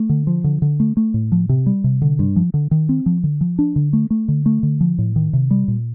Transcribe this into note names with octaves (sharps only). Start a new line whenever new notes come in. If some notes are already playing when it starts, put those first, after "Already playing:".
Already playing: A3
D3
F3
D3
D3
A3
A3
A2
F3
C3
G3
C3
D3
G2
F3
D3
D#3
C4
F3
D3
F3
D4
D3
A3
A3
D3
A3
D3
F3
A2
D#3
C3
G3
A#2